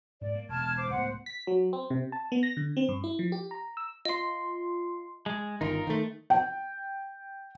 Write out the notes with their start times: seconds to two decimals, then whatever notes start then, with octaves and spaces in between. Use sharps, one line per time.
0.21 G#2 D5
0.35 A#3
0.49 E1 A5 F6 G#6
0.76 C5 D6
0.91 C#2 A2 B3 C5 F#5
1.26 B6
1.47 F#3
1.73 C4
1.90 C3
2.12 A5
2.32 B3
2.43 A#6
2.57 D3
2.77 C4
2.89 G2
3.04 E4
3.19 F3
3.32 G4
3.51 A#5
3.77 E6
4.05 F4 D#5 C6
5.26 G#3
5.61 G1 D#3 D#4 F4 A#4
5.87 D#3 A3
6.30 G5